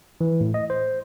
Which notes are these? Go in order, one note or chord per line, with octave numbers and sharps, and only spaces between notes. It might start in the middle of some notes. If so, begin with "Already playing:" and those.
E3
A2
D#5
C5